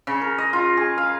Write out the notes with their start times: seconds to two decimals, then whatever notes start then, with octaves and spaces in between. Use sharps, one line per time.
0.07 C#3
0.22 A#4
0.38 D#5
0.53 F4
0.77 G#4
0.98 F5